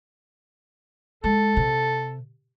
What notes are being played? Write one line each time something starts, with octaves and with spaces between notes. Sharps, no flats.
G#3 A4
C3